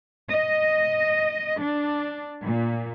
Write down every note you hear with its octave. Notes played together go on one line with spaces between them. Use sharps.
D#5
D4
A#2